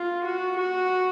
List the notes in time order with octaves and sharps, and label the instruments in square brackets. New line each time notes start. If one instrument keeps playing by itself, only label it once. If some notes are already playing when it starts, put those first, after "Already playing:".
Already playing: [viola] F4
F#4
F#4